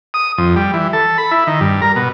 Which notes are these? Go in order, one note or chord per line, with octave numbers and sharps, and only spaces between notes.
D#6
F2
G3
E3
A4
B5
E4
D#3
G2
A#4
B2